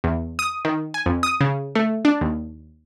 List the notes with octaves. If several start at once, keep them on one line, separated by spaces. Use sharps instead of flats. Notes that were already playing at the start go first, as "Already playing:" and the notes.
E2
D#6
D#3
G#5
F2
D#6
C#3
A3
D4
D#2